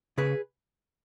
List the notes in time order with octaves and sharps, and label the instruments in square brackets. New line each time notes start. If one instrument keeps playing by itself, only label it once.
[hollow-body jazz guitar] C#3 G#4 B4